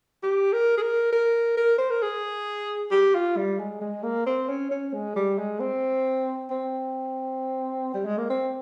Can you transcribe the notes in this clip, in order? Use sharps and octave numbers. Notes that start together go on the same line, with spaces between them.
G4
A#4
G#4
A#4
A#4
A#4
C5
A#4
G#4
G4
F4
G3
G#3
G#3
A#3
C4
C#4
C#4
G#3
G3
G#3
C4
C4
G3
G#3
A#3
C4